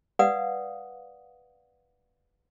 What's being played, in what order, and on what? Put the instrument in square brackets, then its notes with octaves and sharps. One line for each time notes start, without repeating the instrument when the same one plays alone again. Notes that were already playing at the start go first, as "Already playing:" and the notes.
[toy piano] B4 D5 F5 F#5 D#6